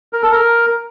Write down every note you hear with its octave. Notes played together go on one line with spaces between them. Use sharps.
A#4
A4
A#4